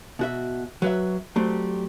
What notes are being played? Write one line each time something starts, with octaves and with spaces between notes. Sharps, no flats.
B2 F#4 E5
F#3 B4 E5
F#3 G3 A3 C4